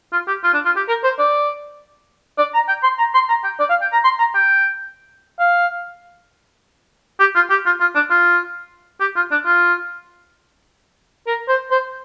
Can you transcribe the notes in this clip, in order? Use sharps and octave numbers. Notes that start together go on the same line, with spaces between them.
F4
G4
F4
D4
F4
G4
A#4
C5
D5
D5
A#5
G5
C6
A#5
C6
A#5
G5
D5
F5
G5
A#5
C6
A#5
G5
F5
G4
F4
G4
F4
F4
D4
F4
G4
F4
D4
F4
A#4
C5
C5